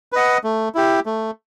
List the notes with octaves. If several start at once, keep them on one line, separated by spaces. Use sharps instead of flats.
B4 D#5 F#5
A3
E4 G4
A3